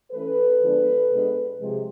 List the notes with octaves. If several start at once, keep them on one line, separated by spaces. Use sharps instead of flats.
E3 A3 C#4 A4 B4
D3 F3 G#3 B3 D4
B2 G#3 B3 D4
C3 F3 G#3